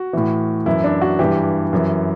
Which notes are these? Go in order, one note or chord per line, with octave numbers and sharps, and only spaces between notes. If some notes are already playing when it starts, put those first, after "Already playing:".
Already playing: F#4
A2 E3
F#2 E3 E4
D4
F#4
G2 E3 G4
F#2 E3